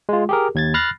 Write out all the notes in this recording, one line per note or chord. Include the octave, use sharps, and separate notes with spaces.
G#3 F4
G4 G#4 A#4
D#2 G#6 A6
B5 F6 F#6 A6 A#6 C7